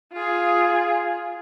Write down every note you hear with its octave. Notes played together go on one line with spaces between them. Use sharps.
F4 G#4